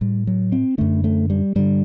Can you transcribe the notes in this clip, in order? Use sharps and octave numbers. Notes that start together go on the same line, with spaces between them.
A2 G3
F#3
C4
F#2 D3 A3
A3
G3
G2 D3 G3